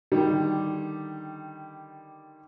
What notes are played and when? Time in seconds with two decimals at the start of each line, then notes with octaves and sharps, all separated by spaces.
0.12 D3 D#3 G3